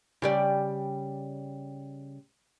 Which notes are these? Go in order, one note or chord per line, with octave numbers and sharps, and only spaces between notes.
C#3 G3 D5